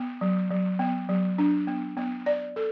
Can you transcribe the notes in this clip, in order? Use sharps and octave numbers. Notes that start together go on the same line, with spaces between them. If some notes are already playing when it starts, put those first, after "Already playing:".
Already playing: B3
F#3
F#3
B3
F#3
D4
B3
B3
D5
A4